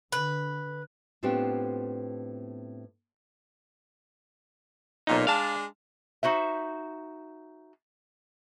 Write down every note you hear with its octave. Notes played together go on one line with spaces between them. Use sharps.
D3 B4
A2 B3 C4 D4 F4 G4
B1 A#2 D#4
G#3 D4 F5 A5
D#4 F#4 C5 E5